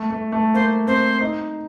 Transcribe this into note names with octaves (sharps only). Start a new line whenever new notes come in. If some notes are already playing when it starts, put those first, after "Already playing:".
Already playing: A3
A3
A3
A#3 C5
C4 C5
D#4